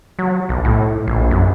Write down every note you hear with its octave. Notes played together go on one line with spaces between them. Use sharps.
F#3
B1
A2
A#1
F#2